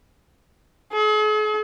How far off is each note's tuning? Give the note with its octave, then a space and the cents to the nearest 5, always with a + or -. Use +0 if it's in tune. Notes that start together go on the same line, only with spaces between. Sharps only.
G#4 +45